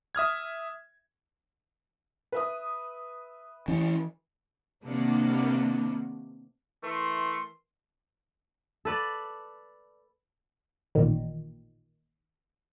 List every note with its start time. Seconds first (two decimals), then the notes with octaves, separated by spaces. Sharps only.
0.15 E5 D#6 F6 G#6
2.32 B4 E5 D#6
3.68 E3 C#4
4.85 C3 D#3 A#3 B3 D4
6.84 E3 A3 A#4 C6
8.85 A4 B4 D5
10.95 A1 A#2 D#3